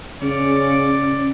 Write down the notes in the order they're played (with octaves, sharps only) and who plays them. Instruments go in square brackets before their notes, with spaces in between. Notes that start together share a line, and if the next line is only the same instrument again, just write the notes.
[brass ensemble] C#3 [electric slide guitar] C#4 [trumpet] D5